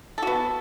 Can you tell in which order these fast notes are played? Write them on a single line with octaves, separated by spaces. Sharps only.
A4 F#4 B3